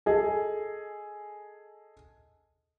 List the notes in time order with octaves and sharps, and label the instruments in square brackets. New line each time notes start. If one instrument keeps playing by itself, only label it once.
[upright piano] G#4 A4 D#5 G#5